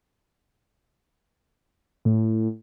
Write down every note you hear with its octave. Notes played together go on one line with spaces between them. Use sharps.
A2